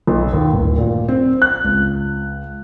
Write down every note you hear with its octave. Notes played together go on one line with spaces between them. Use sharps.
B1
D#2
D1
A#2
C4
F#6
C#2